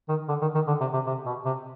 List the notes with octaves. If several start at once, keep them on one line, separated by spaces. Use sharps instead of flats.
D#3
D3
D#3
D#3
D3
C3
C3
C3
B2
C3